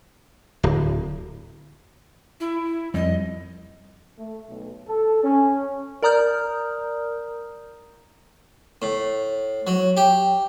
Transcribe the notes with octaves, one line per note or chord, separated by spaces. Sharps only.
D1
E4
F2 G3 D#5
A3
B1
A4
C#4
A#4 D5 A#5 D#6 F6 G6
A2
F#3
G4